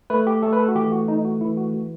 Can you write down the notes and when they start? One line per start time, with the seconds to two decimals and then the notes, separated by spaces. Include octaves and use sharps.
0.10 A3 B4
0.27 G4
0.42 A3 A4
0.53 B4
0.59 A4
0.68 F#4
0.75 E3 G4
0.92 F#4
1.08 A3 D#4
1.25 F#4
1.41 E3 E4
1.57 F#4
1.73 E3 F#4